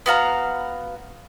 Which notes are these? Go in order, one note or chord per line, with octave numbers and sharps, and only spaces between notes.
B3 F#4 F5 A#5